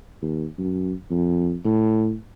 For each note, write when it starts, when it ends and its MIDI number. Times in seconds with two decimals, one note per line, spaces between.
0.22 0.46 39
0.58 0.93 42
1.11 1.55 41
1.65 2.14 45